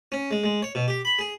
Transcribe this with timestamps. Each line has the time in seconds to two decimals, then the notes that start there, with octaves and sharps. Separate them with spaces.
0.12 C#4
0.31 G#3
0.44 G#3
0.62 C#5
0.75 B2
0.88 G4
1.05 B5
1.19 G#4